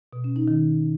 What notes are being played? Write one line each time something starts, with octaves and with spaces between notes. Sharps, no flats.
B2
C#4
D#4
D#3